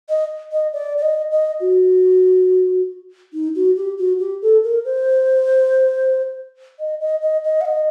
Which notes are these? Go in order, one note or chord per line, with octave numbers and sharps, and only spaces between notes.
D#5
D#5
D5
D5
D#5
D#5
F#4
D#4
F#4
G4
F#4
G4
A4
A#4
C5
D#5
D#5
D#5
D#5
F#5
D#5